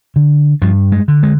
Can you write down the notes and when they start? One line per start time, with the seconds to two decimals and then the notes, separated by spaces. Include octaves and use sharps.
0.16 D3
0.62 G2 F3
0.92 G#3
1.08 D3
1.23 G#3